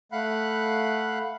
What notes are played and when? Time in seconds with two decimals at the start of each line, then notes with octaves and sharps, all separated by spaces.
0.12 A3 F5 F#5 B5 F#6